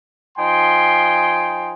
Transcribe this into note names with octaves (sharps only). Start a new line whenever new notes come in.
F3 D#4 G5 G#5 C6